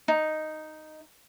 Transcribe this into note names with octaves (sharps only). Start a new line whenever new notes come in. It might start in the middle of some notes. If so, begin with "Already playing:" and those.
D#4